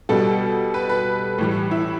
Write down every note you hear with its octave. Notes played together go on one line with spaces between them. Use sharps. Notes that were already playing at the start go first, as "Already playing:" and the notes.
B2 G3 A4
B4
B4
A2 E3 G3
E4